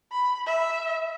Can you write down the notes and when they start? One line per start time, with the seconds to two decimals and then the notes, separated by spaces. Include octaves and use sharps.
0.12 B5
0.46 E5